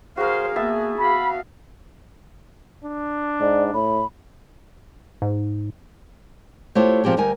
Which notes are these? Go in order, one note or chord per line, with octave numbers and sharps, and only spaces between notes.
F#4 G#4 A#4 C5 F5
A#3 B3 E5 A5
F#4 F5 B5
D4
G#2 D5
A2 B5
G#2
A3 E4 F4 G4 C5 C#5
A#2 F3 C4 G4 G#4
D2 G3 A#4 G#5